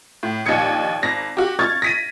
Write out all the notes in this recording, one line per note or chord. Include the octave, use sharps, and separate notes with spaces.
A2
A#1 D#2 D#5 G5 G#6 C#7
G#1 A#6
F#4 G4
C#6 F6 G#6 A6
A#6 B6 D#7